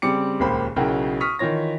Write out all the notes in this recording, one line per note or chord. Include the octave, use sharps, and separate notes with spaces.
C#3 G3 C4 D6 C#7
D#1 C#2 A#3 G4 C5 B5
B1 C#3 E4 F#4 A#4 G5
C#6 D#6 F6 B6
D#3 E3 F4 C#5 A#6